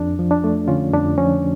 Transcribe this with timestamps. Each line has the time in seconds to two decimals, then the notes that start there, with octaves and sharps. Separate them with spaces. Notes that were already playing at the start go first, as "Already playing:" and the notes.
Already playing: F2 D4
0.19 F3
0.31 D4
0.44 A3
0.68 D3 C#4 F4
0.93 F2 D4
1.18 F3 C#4